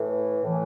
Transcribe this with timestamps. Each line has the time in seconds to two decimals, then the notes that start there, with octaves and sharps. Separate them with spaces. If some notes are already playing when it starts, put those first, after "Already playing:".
Already playing: A2 E3
0.43 A2 E3